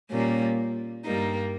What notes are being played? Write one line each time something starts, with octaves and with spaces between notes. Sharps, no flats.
A#2 G3 A#3 C#4
G2 G3 A#3 D#4